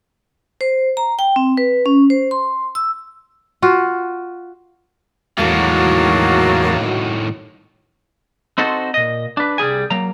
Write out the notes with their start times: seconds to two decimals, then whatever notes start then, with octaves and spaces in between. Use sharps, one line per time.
0.61 C5
0.97 A#5
1.19 G5
1.36 C4
1.58 B4
1.86 C#4
2.10 C5
2.31 C6
2.75 E6
3.62 F4 F#4
5.38 E2 A2 D#3 F#3 G#3 A#3 F#4 A5
8.58 C4 D#4 F#4 A4 C5
8.94 A#2 D#5
9.37 D4 B4
9.58 C2 G3 G#4 G#5
9.90 F#3 A#3 A#5